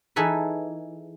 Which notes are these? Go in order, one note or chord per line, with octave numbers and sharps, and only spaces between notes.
E3 D#4 G#4 A4 B4